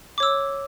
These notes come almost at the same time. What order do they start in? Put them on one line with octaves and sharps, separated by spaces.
D6 C#5 E6